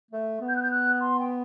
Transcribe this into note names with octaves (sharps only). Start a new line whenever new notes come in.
A3
B3
G6
F#6
G6
F#6
C6
G5